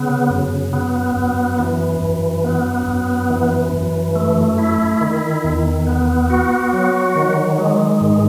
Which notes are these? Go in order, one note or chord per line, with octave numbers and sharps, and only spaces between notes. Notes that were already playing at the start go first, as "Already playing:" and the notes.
Already playing: C#3 B3
F#2
B3
F#2
E3
F#2
B3
F#2
E3
F#2
A3
E4
D#3
E2
B3
F#4
F#3
D#3
G#3
G#2